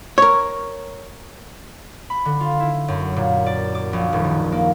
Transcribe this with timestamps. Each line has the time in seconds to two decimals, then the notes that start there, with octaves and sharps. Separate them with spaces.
0.18 A#4 C#5
2.10 B5
2.25 D3
2.40 F4
2.60 E4
2.88 F#2
3.16 A#2
3.46 D5
3.75 D6
3.93 A#1
4.13 D#1
4.25 D#3
4.52 A#3